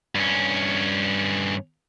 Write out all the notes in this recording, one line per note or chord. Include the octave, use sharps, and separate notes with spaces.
G2 C#4